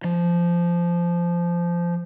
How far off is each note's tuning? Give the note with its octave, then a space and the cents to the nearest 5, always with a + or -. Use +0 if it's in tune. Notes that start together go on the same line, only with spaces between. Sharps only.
F3 -15